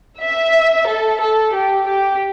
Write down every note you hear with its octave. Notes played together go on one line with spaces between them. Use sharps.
E5
A4
A4
G4
G4